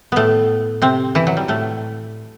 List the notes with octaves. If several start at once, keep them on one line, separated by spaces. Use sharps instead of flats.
A2 A3 B3
C3 C4
E3 E4
F#3
G3
A2 A3